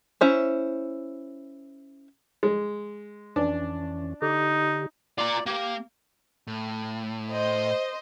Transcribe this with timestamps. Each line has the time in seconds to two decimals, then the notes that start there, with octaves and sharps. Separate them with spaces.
0.21 C#4 E4 C5
2.43 G#3
3.36 F2 E3 C#4 D4
4.22 D3 D#4 G4
5.18 F4 D5 A#5
5.46 A#3 G4
6.47 A2
7.32 C5 D#5